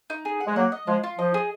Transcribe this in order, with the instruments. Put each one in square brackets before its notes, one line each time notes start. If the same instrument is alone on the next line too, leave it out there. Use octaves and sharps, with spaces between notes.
[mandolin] D#4
G#4
F#5
[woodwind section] G#3
[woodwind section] F#3 A#3 [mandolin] F#5
[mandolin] D#5
[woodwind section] F3 G#3 [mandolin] F4
[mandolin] F4
[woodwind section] F3 [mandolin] D#5
[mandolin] G#4